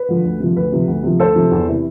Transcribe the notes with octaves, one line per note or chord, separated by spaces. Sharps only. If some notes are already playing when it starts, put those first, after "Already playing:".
Already playing: B4
D3 F3
D2
C3 F3
D2 B4
C3 F3
D2
C3 F3
D2 A4 C5
C3 F3
E2
C3 E3